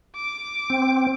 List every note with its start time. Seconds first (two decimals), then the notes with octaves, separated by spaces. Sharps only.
0.16 D6
0.70 C4